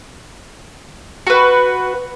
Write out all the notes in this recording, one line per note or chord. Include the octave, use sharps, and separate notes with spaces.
F#4 B4